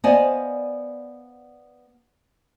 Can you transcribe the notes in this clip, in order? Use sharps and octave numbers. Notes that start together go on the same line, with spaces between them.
B3 C5 D5 D#5 F5 G#5